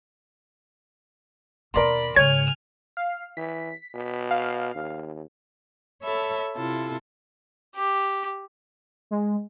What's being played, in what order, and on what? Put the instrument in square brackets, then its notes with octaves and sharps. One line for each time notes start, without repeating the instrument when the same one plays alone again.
[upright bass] D#2 B2 [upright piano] A#4 D5 C6 [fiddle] B5
[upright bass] G#2 C#3 [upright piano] C#5 [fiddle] G#5 F6 [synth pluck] G#6
[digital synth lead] F5
[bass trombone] E3 [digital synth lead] B6
[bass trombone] B2
[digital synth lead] F5
[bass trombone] D#2
[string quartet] A4 C#5 E5 A5 B5
C3 E4 F4 A4
[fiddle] G4
[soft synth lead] G#3